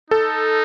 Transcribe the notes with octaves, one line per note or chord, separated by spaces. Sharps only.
D#4 A4